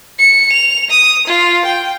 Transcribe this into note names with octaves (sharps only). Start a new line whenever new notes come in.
C#7
F7
D#6
F4
G5